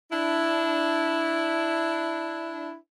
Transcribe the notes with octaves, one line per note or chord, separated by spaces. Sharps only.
D4 E4